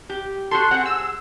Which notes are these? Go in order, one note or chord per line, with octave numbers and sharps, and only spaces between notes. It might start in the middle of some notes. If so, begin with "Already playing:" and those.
G4
F#4 G4 A4 C6
C4 G#4 F#5
E6